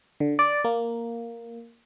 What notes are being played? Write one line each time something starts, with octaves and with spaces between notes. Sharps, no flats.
D3
D5
A#3